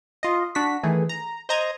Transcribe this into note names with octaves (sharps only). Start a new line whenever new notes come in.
F4 D#5
D4 F#4 B6
D#3 E3 A3 G#4
A#5
C5 D#5 A#5 D#6 G#6